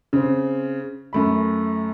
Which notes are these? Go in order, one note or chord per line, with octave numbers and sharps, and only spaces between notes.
C#3 C4
F#2 A3 B5